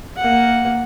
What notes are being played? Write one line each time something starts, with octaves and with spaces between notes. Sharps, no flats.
A#3 F#5